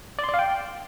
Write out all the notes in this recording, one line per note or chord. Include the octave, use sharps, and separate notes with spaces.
D5
C6
D5
F5
G5